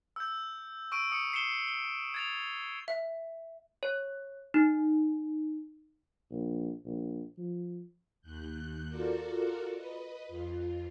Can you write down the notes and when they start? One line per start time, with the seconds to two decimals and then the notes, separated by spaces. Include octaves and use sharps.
0.16 E6 G6
0.92 C#6 E6 D7 D#7
1.12 D#6 C#7
1.33 C7 C#7 E7 G7
1.68 G7
2.14 G#6 A6 F7
2.88 E5
3.83 C#5
4.54 D#4
6.31 A#1
6.85 A#1
7.37 F3
8.21 D#2 F#6 G6
8.89 F4 F#4 A4 A#4 D5
9.74 B4 D#5
10.27 F2 F4